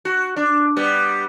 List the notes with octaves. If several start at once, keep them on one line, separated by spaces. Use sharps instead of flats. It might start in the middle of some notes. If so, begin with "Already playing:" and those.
F#4
D4
G3 B3